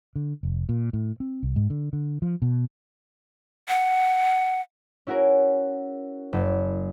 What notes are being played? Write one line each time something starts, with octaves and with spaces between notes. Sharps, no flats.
D3
F1
A#2
A2
C4
C2
G#2
D3
D3
F3
B2
F#5
C#4 E4 F#4 G#4 A#4
F#1